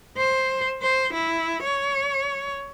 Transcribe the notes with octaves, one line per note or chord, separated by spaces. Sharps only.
C5
C5
E4
C#5